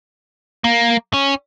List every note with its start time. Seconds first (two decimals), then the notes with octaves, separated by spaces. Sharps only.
0.64 A#3
1.13 C#4